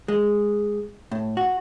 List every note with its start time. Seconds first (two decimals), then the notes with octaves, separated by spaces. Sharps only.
0.08 G#3
1.11 A2
1.37 F#4